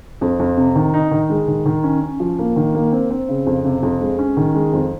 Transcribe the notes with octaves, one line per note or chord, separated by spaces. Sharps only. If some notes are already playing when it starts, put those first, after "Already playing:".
F2
F2
C3
D#3
D#4
D#3
G#3
D#3
D#3
C#4
C#4
F3
A#3
D#3
A#3
C4
C4
C#3
F2
C3
F2
G#3
C#4
D#3
G#3
F2